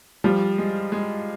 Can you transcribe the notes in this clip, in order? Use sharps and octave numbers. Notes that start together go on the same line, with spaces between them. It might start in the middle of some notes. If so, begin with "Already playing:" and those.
F3 G3
G#3
G#3